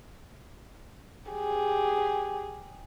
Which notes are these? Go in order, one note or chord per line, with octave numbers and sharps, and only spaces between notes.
G4 G#4